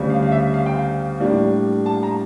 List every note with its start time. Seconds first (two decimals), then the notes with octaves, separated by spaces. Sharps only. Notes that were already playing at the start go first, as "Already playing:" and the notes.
Already playing: D2 C#3 G3 C#4
0.10 F5
0.23 F5
0.31 E5
0.54 F5
0.66 G5
0.79 F5
1.20 A2 G3 A#3 D4
1.86 A5
2.03 A#5